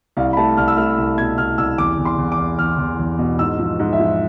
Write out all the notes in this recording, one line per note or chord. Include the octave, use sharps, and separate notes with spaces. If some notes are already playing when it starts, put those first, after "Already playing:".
C2 F5
B5
A3 A5
C2 F6
E6
A3 F6
C2
B2 G#6
C2 F6
C2 E6
E2 D6
E2
C6
E2
D6
E2
E2 F6
E2
E2
B2
G#2 E6
F3
G#2
E5
F3